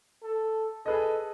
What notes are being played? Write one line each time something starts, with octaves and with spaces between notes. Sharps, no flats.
A4
G#4 A4 B4 D#5